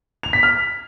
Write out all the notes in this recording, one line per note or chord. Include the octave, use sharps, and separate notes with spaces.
F7
B6
F6